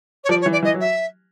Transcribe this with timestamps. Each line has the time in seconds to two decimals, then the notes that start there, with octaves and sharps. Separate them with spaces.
0.24 C#5
0.29 F3 D5
0.41 C#5
0.46 E3
0.52 D5
0.63 E3 D#5
0.74 F#3
0.80 E5